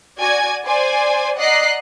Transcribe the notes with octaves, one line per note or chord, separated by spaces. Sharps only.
F#4 D5 G#5 G#6
C5 D5 G#5
D5 D#5 F#5 A#5 F#6 C7